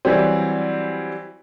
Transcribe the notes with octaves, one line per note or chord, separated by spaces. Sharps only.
E3 F#3 G3 C4